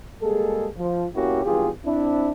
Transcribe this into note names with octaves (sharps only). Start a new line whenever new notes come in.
G3 G#3 A#3 G#4 A4
F3
B2 A#3 C#4 E4 F#4 G4
G#1 E2 G2 F4 G4 G#4
C4 D4 E4